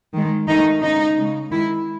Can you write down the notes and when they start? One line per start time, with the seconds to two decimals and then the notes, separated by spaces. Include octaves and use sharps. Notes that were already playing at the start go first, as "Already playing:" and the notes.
0.13 D#3 G#3
0.48 D#3 A3 D#4
0.82 C#3 G#3 D#4
1.17 C#3 G#3
1.50 D#3 G#3 E4